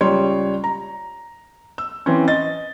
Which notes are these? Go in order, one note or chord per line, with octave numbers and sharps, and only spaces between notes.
C#2 G3 C#5 C6
A#5
E6
E3 C4 C#4
D#5 A6